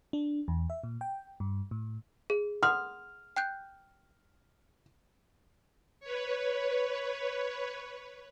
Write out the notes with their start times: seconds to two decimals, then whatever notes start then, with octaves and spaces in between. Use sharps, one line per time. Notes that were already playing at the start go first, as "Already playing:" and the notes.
0.13 D4
0.48 E2
0.70 E5
0.84 A#2
1.01 G5
1.40 G2
1.71 A2
2.30 G#4
2.63 F#5 C6 D#6 F6
3.36 G5 F#6 G6
6.00 B4 C#5